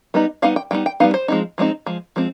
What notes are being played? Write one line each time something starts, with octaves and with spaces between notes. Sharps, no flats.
G3 B3 D#4
G3 B3 D#4 F5
G5
G3 B3 D#4 G5
G5
G3 B3 D#4 F5
C5
F3 G#3 C4 D#4
F3 G#3 C4 D#4
F3 G#3
F3 G#3 C4